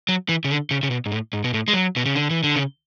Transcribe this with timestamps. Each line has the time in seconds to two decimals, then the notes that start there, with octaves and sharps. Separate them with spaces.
0.09 F#3
0.29 E3
0.44 C#3
0.50 D3
0.71 C#3
0.83 C#3
0.90 B2
1.06 G#2
1.12 A2
1.33 G#2
1.44 B2
1.54 A2
1.68 G#3
1.73 F#3
1.96 B2
2.06 C#3
2.15 D3
2.30 E3
2.44 D3
2.56 C#3